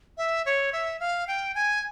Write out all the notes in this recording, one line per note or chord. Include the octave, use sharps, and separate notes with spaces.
E5
C#5
E5
F5
G5
G#5